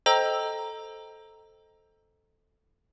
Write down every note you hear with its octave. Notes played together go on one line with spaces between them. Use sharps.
A4 C5 D#5 G5 A#5 E6